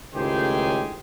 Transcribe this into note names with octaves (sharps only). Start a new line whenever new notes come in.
C#2 A2 D#3 G4 G#4 C5